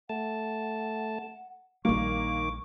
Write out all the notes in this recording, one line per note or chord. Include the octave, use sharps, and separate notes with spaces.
A3 F#5 A5
A#1 D#3 G3 A#3 C#6 D6